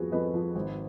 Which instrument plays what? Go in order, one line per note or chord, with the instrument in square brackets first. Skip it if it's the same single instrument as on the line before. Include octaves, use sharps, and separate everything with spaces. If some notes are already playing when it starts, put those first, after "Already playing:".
Already playing: [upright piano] F2 F3 B3 F#4 G#4 B4
F2 B4 D#5
F3
G#1